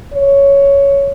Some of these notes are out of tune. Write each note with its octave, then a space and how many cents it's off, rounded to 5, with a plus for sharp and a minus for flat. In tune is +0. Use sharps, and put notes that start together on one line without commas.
C#5 +5